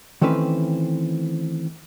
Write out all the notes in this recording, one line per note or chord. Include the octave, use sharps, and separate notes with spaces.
D#3 E3 A3 C4 C#4 B4